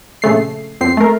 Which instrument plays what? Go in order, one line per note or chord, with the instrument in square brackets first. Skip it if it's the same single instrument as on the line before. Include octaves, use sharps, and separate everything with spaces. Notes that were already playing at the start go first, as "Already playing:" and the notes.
[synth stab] A#1 C#3 A3 C7
F2 C4 C7
A3 A#4